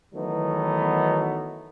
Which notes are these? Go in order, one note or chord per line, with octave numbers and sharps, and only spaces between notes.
D#3 E3 F#3 A3 B3 D#4